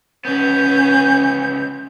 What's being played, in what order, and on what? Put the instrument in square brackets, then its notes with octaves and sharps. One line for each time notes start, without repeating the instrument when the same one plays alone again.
[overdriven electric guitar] C#2 B3 [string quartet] C#4 [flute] G6